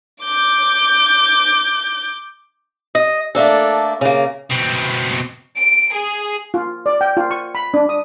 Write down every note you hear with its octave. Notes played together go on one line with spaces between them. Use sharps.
D6 G6
D#5
A3 A#3 D4 A4
C#3 A#3
B2 C4
D7
G#4
F4
D5
G5
F4
C#6
B5
D4
D#6